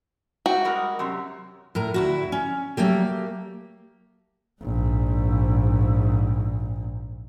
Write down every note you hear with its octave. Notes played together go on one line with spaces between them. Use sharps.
F#4 G5
G3 G#3 A#4
F#2 C3
A2 A#4 A#5
D2 E4 F#4
C#4
F#3 A3 A#3 G4
A#1 G#2